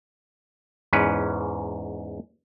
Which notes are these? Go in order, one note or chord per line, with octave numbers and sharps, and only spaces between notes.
E2 G#2 C#4 B4